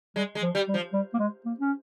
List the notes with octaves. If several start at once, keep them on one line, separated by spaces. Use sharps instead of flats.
G3 G#3
G#3
F3
G3
G3
F3
G3
A#3
G#3
A#3
C#4